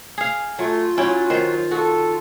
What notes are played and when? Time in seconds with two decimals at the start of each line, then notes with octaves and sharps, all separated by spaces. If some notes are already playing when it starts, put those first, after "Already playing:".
0.18 G#4 F5
0.59 F#3 A3 F4
0.98 F#3 C#4 E4 G5
1.30 D#3 C5
1.71 F#4 A4